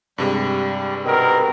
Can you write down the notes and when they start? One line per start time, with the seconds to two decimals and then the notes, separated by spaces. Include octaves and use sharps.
0.18 G2 C3 G3 G#3
1.04 B2 D#3 C4 A#4